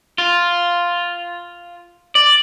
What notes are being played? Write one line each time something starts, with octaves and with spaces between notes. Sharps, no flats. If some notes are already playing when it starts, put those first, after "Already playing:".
F4
D5